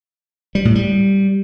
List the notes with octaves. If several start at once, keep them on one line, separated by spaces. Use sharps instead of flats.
G3
A2
G3